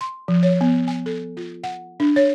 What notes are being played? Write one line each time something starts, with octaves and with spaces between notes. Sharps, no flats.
C6
F3
C#5
B3
G#5
A4
F4
F#5
D4
C#5